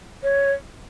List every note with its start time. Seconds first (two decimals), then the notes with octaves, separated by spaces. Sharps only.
0.23 C#5